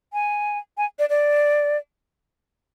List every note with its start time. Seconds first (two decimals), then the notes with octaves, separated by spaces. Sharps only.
0.13 G#5
0.77 G#5
0.99 D5
1.09 D5